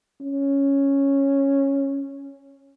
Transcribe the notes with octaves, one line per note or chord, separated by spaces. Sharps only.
C#4